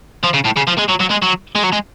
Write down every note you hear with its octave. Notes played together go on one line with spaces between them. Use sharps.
F3
C#3
A2
C#3
F3
G#3
F#3
F#3
G#3
F#3
G#3
F#3
G#3